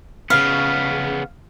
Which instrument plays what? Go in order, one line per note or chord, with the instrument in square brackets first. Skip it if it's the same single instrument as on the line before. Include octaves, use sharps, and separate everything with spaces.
[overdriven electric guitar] C#3 B3 [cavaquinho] F5